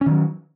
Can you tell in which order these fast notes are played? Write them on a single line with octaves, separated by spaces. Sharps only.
C#4 D#3 F#3